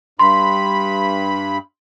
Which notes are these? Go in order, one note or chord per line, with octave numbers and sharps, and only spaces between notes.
G2 B5 C6